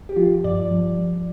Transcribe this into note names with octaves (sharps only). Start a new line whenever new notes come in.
G4
F3 F4
G2 D5
F3
G2